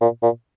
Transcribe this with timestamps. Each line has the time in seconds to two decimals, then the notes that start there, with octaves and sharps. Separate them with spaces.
0.01 A#2
0.23 A#2